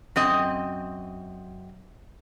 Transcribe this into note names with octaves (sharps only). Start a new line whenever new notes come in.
F#2 C4 D#5